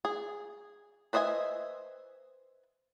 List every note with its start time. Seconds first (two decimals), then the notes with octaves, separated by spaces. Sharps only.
0.05 G#4
1.13 B4 C5 D#5 E5 G#5